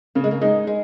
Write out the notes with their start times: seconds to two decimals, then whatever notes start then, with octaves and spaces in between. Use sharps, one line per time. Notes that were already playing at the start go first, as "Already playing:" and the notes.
0.15 C#3 A#3
0.24 G#3
0.31 A#3
0.41 G#3 D#4
0.67 G#3